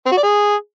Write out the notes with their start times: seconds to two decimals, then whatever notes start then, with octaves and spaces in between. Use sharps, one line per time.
0.06 C4
0.12 F#4
0.17 D5
0.23 G#4